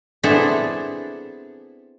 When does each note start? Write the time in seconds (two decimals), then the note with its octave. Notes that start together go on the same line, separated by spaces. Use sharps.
0.23 B3 C4 D4 E4 G#4 A4